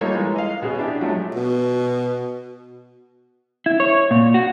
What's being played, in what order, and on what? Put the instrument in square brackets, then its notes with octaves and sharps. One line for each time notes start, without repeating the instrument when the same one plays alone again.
[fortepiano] G3 A#3 D#4 F4 A4 C#5
E3 G#3
D#5 F5
B2 C#4 G#4
D4 E4 G4
F3 F#3 G#3 A3
[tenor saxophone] B2
[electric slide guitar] E4
C#5
A#2
F#4